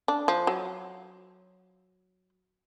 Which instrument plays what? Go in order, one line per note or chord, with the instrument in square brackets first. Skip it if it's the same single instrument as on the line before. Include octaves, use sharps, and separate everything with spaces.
[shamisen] D4
F3
F#3